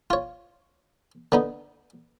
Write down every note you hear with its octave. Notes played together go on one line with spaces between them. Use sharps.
F4 C#5
D3 B3 D#4